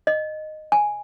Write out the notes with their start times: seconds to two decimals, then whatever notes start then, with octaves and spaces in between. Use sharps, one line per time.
0.07 D#5
0.72 G#5